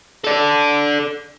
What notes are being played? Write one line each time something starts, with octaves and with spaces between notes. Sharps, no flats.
A4 D5